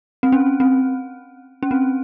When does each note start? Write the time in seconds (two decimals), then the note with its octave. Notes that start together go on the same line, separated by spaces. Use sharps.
0.23 C4
0.32 C#4
0.60 C4
1.63 C#4
1.71 C4